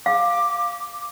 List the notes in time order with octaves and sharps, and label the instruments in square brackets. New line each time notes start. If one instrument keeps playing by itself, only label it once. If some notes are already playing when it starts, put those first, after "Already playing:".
[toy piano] F5 [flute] D6